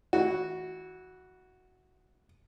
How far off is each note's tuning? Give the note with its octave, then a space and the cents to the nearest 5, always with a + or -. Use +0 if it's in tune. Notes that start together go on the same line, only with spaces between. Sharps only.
E3 -25 F#4 +0